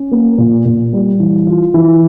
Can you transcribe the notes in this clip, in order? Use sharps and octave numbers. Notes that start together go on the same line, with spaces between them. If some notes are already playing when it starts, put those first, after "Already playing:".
Already playing: C#4
A#3
A#2
A#2
G3
E3
F4
E3